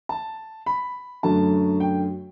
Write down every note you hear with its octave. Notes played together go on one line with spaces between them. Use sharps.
A5
B5
F#2 D3 F#3 A3 A5
G5